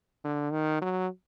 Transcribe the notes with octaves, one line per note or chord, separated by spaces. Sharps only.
D3
D#3
F#3